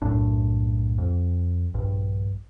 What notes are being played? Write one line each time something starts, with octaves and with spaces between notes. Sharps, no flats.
B1 F#2 A2 D4
F2
A#1 G2